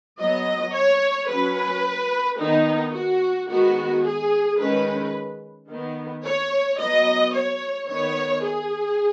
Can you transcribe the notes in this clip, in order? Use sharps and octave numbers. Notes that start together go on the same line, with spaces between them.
F#3 B3 D#5
C#5
F#3 C#4 B4
D#3 B3 D#4
F#4
D#3 G#3 B3 F#4
G#4
D#3 G#3 C#4 B4
D#3 B3
C#5
F#3 B3 D#5
C#5
D#3 B3 C#5
G#4